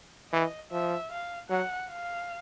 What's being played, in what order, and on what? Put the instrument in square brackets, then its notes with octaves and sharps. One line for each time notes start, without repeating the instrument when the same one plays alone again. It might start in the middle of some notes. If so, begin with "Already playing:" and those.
[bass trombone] E3 [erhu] D#5
[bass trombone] F3 [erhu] E5
[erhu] F5
[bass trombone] F#3 [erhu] F#5
[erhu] F5